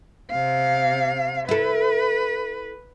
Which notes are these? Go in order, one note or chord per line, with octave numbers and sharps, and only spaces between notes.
C3 F5
E4 A4 B4